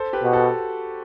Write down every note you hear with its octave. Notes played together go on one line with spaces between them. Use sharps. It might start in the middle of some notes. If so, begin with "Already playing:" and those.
Already playing: A4 C5
G4 B4
B2
F#4 A4